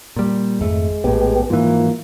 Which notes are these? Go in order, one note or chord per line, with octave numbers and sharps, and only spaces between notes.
A#2 G3
G#1 F2 G#3 A3
A#1 A2 B3 G4
G#2 E3 F3 A#3